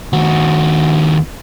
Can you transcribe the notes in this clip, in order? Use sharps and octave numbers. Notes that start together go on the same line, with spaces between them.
D#2 F#4